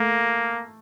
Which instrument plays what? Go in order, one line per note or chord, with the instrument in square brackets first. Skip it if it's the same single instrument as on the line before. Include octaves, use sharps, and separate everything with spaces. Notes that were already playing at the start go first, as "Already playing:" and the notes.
Already playing: [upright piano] A3 [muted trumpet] A#3